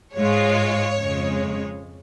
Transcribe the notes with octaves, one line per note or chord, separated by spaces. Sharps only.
G#2 G#3 F4 C#5
F2 C#3 G#3